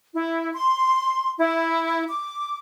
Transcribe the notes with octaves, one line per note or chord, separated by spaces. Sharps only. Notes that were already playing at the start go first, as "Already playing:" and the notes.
E4
C6
E4
D6